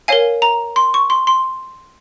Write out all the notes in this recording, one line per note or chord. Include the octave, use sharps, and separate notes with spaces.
A#4 C#5 F5 G#5
A#5
C6
C#6
C6
C6